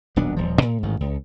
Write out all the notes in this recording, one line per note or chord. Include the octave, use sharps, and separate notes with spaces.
D#1 B1 B3 D4
D#1 F3
A2
A1 G#2 D#3
C#2